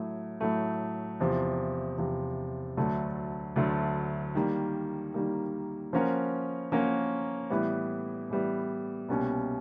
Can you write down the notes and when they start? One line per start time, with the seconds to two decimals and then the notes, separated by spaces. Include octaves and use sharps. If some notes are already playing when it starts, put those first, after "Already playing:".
Already playing: A2 F#3 A3
0.40 A2 F#3 A3
1.20 E2 C3 F3
1.98 E2 C3 F3
2.77 D2 D3 F#3 A3
3.56 D2 D3 F#3 A3
4.35 D#3 G3 A#3
5.14 D#3 G3 A#3
5.93 F3 A#3 C#4 F#4 A#4
6.72 F3 A#3 C#4 F#4 A#4
7.50 A2 E3 G3 B3
8.30 A2 E3 G3 B3
9.09 C2 B2 G3 A#3 C#4